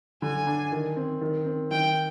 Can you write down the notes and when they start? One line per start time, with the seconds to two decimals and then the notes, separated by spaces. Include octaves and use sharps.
0.22 D3 G#5
0.47 D4
0.72 D#3
0.97 C4
1.21 D#3
1.46 C4
1.71 D#3 G5